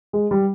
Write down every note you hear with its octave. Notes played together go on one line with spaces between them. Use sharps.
G#3
G3